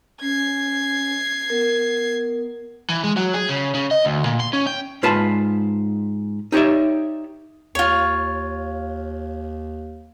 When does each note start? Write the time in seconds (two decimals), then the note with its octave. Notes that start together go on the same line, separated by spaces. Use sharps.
0.21 C#4 G#6 C7
1.50 B3 A#4
2.90 E3
3.04 G#3
3.17 F#3
3.34 G#4
3.49 C#3
3.75 C#3
3.91 D#5
4.05 D2
4.25 A#2
4.40 C6
4.53 C#4
4.67 G5
5.03 G#2 F4 B4 A5
6.52 D#4 G4 C#5 D5 E5
7.75 D#2 F4 C#5